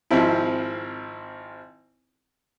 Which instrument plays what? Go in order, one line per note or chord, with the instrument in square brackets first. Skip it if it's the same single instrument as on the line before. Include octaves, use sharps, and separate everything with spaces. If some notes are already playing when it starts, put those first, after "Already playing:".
[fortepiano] G#1 F3 C4 E4